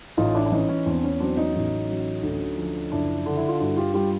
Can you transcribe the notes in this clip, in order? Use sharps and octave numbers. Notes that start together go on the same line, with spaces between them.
A1 D#4 F4
D4 E4
D4
E3 C#4 D#4
C#4 D#4
E2 C4 D4
C#4
F#3 C4 D4
C#4 D#4
A1
F#3
D2
F3
F#1 D4 E4
D3
E4
F4
G2 E4 F#4
F4 G4
G3 F4 G4